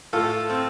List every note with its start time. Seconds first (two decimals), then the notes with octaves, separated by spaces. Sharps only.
0.13 A2 F4 A4
0.50 C4